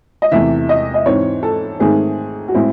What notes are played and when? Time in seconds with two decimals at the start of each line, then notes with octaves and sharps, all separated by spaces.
0.22 D#5
0.31 E2 C3 E3 A3 E5
0.69 D#5
0.94 D#5
1.06 G#2 E3 C4 C#5
1.43 A4
1.80 G#2 D#3 A3 C4 G#4
2.48 F#4
2.54 A2 G#3 C4 E4